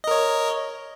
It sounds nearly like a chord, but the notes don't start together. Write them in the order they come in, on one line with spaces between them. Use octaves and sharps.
D#5 A#4 C#5